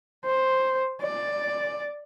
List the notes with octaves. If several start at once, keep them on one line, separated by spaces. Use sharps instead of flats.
C5
D5